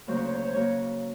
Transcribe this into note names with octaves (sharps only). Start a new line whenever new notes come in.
D2 C#3 F#3 A#3 C5
C#5
C5
C#5
C5
C#3 F#3 A#3 C#5